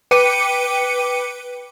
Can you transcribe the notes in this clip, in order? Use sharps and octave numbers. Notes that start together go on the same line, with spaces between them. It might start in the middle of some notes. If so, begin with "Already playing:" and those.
B4 G5 D6 C#7 D#7